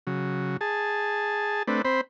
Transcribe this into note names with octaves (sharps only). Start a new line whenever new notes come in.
C#3 F#3
G#4 A5
A3 C4 D4 B4
C4 C5 B5